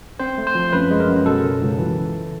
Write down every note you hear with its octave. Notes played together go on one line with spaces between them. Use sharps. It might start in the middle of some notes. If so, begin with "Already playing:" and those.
C4 C5
A3
C5
F3
F#2 B4
G#3
A#4
F#2
B2 A4
C#2
C#2
E3